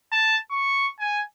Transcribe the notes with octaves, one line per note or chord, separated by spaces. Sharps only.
A5
C#6
G#5